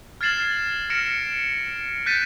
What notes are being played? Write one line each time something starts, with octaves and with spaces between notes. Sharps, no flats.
F6 G#6 A6 C7 E7 F#7
F6 A#6 C#7 D7 E7
F#6 G6 A6 B6 C#7 D#7